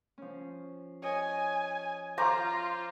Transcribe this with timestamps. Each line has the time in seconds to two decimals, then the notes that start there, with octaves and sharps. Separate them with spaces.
0.18 F3 C#4
1.02 C#5 D#5 G#5 D#6
2.18 F4 C5 A#5 D6